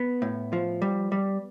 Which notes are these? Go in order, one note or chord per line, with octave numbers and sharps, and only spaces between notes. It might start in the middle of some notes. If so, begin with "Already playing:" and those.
Already playing: B3
A2
F3
G3
G3